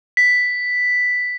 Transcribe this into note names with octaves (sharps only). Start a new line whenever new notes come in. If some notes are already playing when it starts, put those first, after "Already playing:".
B6